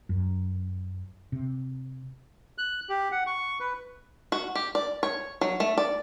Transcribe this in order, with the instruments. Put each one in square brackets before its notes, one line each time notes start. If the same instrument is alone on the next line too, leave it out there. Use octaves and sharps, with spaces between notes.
[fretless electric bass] F#2
C3
[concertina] F#6
G4
F#5
C#6
B4
[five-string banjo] F#4
G4
D5
C#5
F#3
A3
D5